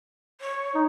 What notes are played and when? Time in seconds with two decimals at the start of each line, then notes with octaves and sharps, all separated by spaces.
0.41 C#5
0.75 D#4